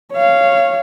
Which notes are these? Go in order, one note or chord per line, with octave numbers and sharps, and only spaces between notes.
C#5 F5